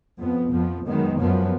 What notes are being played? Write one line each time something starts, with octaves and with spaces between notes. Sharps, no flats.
F2 F3 B3
F2 F3 B3
F#2 D#3 G#3 B3
F#2 F3 B3